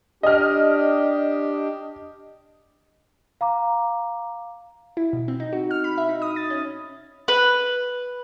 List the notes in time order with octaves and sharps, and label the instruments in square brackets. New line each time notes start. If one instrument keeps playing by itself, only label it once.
[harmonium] D4 G4 [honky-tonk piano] D#5 F6
[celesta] F5 A#5 D6
[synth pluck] E4
B2
C4
D#4
F#4
F6
B5
E5
D#4
D#6
A6
C#4
[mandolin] B4